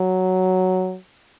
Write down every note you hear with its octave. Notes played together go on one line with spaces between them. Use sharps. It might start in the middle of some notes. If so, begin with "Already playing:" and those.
Already playing: F#3